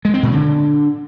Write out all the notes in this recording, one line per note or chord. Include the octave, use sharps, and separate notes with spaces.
G#3
C4
A#2
D3